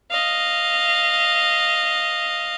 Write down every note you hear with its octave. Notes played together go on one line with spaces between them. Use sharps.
D#5 F5